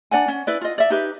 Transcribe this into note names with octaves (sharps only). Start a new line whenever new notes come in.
D4 D5 F#5 G#5
C#4
E4 B4 D5
F4 D#5
D5 E5
D#4 G4 B4